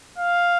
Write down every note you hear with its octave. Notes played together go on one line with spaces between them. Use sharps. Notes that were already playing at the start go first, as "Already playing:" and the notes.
F5